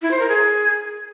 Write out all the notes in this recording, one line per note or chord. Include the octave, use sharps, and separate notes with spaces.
E4
C5
A#4
G#4